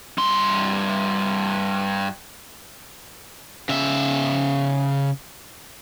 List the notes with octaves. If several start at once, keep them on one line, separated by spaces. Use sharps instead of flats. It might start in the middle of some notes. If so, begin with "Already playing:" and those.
G2 C6
C#3 E5